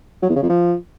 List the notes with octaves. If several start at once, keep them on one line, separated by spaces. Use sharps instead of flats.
F#3
E2
C#3
F2
F3